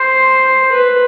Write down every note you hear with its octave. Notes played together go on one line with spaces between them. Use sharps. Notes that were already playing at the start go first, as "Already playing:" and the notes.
Already playing: C5
B4